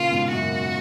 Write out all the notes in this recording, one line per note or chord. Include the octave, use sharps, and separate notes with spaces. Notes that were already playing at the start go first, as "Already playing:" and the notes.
Already playing: A#2 C#3 F4
G#2 B2
F#2 A#2 F#4